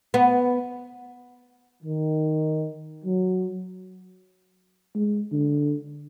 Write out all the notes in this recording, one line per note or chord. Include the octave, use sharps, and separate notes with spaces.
B3
D#3
F#3
G#3
D3